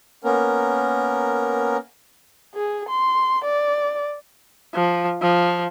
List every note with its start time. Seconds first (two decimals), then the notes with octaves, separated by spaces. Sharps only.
0.24 A#3 B3 C#4 A#4
2.55 G#4
2.89 C6
3.44 D5
4.75 F3
5.22 F3